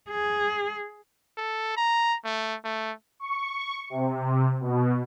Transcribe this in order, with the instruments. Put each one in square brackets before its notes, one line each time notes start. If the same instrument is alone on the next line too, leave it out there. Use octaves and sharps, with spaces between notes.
[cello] G#4
[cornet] A4
A#5
A3
A3
[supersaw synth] C#6
C3
B2